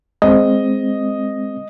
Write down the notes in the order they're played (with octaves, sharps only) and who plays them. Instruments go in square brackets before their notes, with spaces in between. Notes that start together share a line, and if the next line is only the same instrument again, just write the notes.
[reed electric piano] G#3 C4 [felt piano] D#5